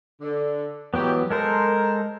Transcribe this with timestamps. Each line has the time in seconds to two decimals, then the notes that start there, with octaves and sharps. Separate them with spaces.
0.21 D3
0.94 E3 F#3 G#3 B3 G4
1.31 G#3 A4 A#4 C5